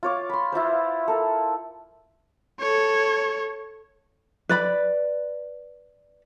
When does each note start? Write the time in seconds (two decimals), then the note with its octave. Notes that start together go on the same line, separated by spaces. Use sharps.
0.03 F4 C#5 D6
0.29 B5 C6
0.52 E4 F4 B4 C5
1.08 A4 A#4
2.60 A4 C#5
4.49 B4 D5 B5